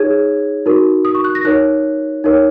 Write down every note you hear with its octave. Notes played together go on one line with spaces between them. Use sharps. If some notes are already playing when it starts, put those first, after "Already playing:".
Already playing: D#4 G#4 C#5 G#6
D#4 F#4 A#4
D#6
C#6
F#6
A#6
D#4 A#4 C#5 F#6
D#4 A#4 C#5